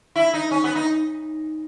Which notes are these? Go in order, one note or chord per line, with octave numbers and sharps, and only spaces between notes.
E4
D#4
C#4
B3
D#4